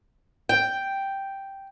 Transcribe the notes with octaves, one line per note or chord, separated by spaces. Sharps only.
G5